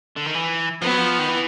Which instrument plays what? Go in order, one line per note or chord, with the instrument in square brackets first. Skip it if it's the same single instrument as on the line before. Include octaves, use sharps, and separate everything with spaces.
[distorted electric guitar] D3
D#3
E3
[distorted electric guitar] F3 [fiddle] B3
[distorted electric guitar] F#3
F3
D#3
E3